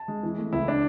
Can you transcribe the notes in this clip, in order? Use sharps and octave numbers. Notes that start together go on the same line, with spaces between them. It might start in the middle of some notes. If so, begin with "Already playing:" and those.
Already playing: A5
G#3
E3
A3
C#2 E4
D4